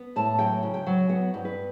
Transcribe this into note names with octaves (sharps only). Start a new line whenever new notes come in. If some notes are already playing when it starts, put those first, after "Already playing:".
Already playing: B3
A2 A5
F#3 G5
C#3
G5
F#3
B3 F#5
G2
B4